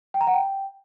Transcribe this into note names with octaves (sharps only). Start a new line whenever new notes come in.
G5
A#5
F#5
G5